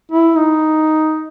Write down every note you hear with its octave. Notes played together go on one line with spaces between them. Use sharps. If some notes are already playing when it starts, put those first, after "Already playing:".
E4
D#4